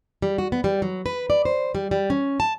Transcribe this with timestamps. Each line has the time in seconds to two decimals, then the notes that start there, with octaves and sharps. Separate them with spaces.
0.22 G3
0.38 F#4
0.52 B3
0.64 G3
0.82 F#3
1.06 B4
1.30 D5
1.45 C5
1.75 G3
1.91 G3
2.10 C#4
2.40 A5